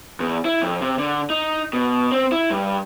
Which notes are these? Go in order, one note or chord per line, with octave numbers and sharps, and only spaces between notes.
E2
E4
F2
C3
D3
D#4
B2
C4
E4
G2